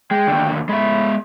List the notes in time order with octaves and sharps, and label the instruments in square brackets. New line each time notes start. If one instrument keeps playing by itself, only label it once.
[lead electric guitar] G#3 [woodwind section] G5
[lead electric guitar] D#2 D3
[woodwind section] A2 B5 [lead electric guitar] G#3 E5